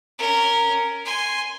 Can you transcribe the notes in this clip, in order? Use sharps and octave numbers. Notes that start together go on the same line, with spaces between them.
C#4 A#4
G#5 C6